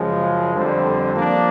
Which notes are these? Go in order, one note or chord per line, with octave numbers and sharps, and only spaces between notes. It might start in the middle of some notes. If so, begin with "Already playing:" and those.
Already playing: F#2 C#3 F3 G#3
F2 D3 G3 C4
F3 A#3 D4